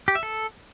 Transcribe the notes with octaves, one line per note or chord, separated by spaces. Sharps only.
G4
E5
A4